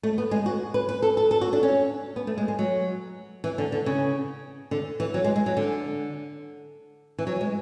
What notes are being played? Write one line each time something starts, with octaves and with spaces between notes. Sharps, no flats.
A3
B3
G#3
F#4
B4
B4
A4
A4
A4
F#4
D4
C#4
B3
A3
G#3
G#3
F#3
E3
D3
D3
C#3
D3
E3
F#3
G#3
G#3
F#3
D3
E3
F#3
G#3